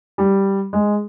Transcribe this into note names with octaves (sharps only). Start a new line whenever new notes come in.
G3
G#3